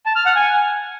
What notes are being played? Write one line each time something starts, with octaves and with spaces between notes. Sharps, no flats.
A5
F6
F#5
G#5